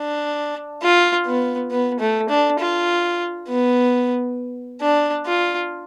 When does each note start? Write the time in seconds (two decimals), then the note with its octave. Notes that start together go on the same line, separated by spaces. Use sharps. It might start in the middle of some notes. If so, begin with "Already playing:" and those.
Already playing: D4
0.83 F4
1.26 B3
1.71 B3
2.00 A3
2.29 D4
2.59 F4
3.49 B3
4.81 D4
5.26 F4